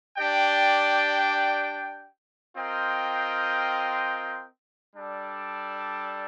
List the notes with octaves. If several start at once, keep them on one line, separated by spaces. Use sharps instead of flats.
D4 G4 D5 G5
C4 F4 A#4 D#5 G5
G3 D4 A4